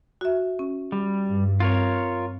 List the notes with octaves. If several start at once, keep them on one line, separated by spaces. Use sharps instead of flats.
F#4 E5
C#4
G3
G2
C4 F4 A#4 C#5